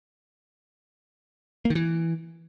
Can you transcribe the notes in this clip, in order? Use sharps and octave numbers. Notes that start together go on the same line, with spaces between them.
A#3
D#3
E3